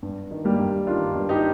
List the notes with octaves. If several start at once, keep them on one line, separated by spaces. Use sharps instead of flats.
G2
D#3
G3 A#3
G2
D#3 D4 F4
G2
D#4 G4